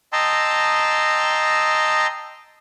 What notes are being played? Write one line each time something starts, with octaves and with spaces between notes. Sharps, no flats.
D#5 G5 A5 A#5 C6 E6